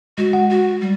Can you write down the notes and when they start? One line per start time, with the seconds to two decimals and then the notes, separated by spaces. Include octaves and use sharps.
0.18 G#3 F#4
0.33 F#5
0.50 F#4
0.81 G3